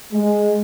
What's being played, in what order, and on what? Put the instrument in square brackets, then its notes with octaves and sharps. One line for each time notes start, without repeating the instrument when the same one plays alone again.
[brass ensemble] G#3